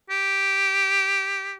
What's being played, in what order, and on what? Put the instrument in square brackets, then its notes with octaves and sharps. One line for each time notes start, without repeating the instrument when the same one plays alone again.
[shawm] G4